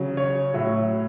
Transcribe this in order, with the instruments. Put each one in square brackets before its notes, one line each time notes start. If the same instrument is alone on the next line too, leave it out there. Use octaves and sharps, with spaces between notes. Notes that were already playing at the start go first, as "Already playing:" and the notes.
Already playing: [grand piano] C#3 F#3
C#5
A2 F#3